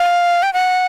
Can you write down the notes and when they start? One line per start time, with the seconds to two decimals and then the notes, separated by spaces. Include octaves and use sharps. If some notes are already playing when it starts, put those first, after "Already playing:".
Already playing: F5
0.43 G5
0.53 F#5